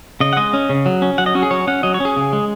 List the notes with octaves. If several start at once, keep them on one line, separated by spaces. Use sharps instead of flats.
C#3 D#5
F#5
G#3 D#5
C#4
C#3
F#3
C#4
F#3 F#5
D#5
C#4 F#4
G#4
F#3 C#5
C#4 F#5
F#3 D#5
C#5
C#4 G#4
C#3
G#3